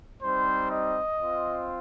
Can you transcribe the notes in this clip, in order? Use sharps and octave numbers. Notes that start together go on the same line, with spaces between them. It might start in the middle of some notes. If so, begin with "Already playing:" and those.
G3 C4 D#4 C5
D#5
C4 F4